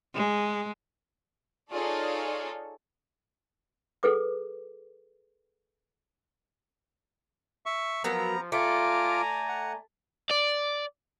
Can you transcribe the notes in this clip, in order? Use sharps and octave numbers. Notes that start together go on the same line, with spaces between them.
G#3
D#4 F4 G#4 A4 C#5 D5
G#4 A4 B4 D6
E5 C#6
F3 F#3 B3 A#4 A#5
A3 F4 D5 G#5 A#5 D6
F#5
D5